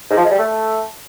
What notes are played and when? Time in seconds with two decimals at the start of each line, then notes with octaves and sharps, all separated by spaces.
0.10 G#2
0.17 F3
0.24 G#3
0.31 G3
0.38 A3